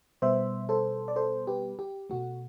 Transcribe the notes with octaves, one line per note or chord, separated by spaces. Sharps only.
B2 G3 B3 C5 E5
A4 C5
D5
A4 C5
G4 B4
G4
B2 A3 F#4